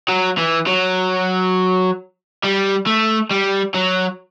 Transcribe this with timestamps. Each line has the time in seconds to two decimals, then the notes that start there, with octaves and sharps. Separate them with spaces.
0.09 F#3
0.38 E3
0.67 F#3
2.43 G3
2.87 A3
3.31 G3
3.74 F#3